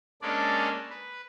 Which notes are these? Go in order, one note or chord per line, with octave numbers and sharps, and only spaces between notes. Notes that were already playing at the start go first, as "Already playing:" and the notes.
G#3 A#3 C#4 D4 A4 D5
B4